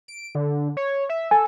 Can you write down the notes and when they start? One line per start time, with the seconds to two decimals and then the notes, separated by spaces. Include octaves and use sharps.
0.08 D7
0.35 D3
0.77 C#5
1.09 E5
1.31 A4 G#5